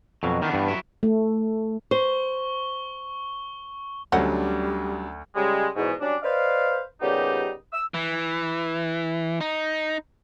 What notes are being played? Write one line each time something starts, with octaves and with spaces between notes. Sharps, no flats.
F2 B2 F#3
D#3 E3 B3 D4
G2
F#3 E4
A3
C5 C#6 G7
D2 F#3 G3 C#4 D4 C5 D#5 F#5
C#3 G3 G#3
E2 G#2 B2
F#3 G3 C#4 D4
B4 C5 D5 D#5 F5
A#2 C#3 G3 B3 D#4 G4
E6
E3
D#4